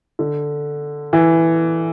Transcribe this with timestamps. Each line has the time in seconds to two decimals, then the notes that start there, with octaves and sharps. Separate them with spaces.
0.19 D3
1.13 E3